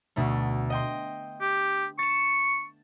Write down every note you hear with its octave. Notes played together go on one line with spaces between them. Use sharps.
D2 B2 A3
D#5 G5 C6
G4
C#6 A6 E7